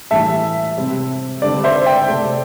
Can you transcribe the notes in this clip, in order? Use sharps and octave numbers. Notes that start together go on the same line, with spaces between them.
A2 E3 G3 E5 A5
C3 G3 C4
D3 G3 C4 D5
C5 E5
D5 G5
C3 A3 C4